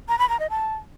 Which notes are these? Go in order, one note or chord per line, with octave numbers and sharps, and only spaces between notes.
A#5
B5
A#5
D#5
A5